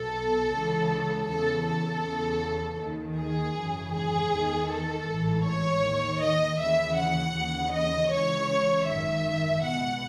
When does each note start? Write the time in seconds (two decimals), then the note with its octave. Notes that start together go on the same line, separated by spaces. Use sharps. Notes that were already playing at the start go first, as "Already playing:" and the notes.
Already playing: B1 B2 A4
0.51 C#2 C#3 E3
1.27 E2 C#3 E3 A4
1.65 A4
2.03 E2 C#3 E3
2.78 D#2 D#3
3.16 G#4
3.54 G#1 F#2 C#3 E3
3.92 G#4
4.31 E2 D#3
4.69 A4
5.07 A1 G#2 E3
5.44 C#5
5.82 D#2 D#3
6.20 D#5
6.58 D#2 C#3 E3 E5
6.96 F#5
7.34 D#2 C#3 E3
7.73 D#5
8.10 C#2 C#3 E3 C#5
8.87 G#1 F#2 D#3 E5
9.62 C#2 B2 F#5